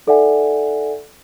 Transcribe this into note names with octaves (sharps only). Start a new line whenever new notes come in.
D#4 A4 D5 E5 F#5 G#5